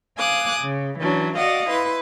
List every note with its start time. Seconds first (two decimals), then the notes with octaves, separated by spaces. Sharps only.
0.17 F5 G#5 D6 D#6 F#6
0.61 C#3
0.99 E3 F#3 C#4 D4
1.36 F#4 D5 D#5 F5 F#5
1.69 E4 B4 C6